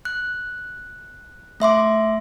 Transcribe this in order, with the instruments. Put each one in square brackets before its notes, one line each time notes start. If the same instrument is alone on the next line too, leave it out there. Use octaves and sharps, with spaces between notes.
[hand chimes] F#6
A3 E5 C6 D6